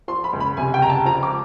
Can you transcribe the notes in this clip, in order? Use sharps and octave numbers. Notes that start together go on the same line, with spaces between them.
F3 C6
B5
C#2
B5
C3 G#5
G5
C#2 A#5
A5
F3 A#5
D6